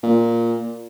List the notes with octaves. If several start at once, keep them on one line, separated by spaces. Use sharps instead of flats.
A#2